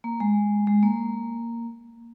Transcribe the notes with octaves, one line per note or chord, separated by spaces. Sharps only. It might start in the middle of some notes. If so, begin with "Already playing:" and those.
A#3
G#3
G#3
A#3